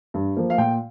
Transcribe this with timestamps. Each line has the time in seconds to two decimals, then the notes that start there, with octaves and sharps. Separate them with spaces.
0.14 G2
0.37 F3 A#3
0.50 F5
0.58 A#2 G5